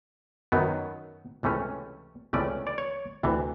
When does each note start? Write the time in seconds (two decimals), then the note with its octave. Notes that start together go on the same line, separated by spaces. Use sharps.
0.52 F#2 D#3 F#3 B3
1.43 C#2 C3 E3 A3 C#4
2.33 C#2 C3 E3 A3 C#4 D5
2.67 D5
2.78 C#5
3.23 D2 C3 E3